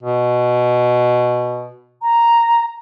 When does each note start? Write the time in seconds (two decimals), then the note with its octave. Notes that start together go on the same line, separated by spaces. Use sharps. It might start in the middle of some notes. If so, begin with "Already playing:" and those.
0.03 B2
2.02 A#5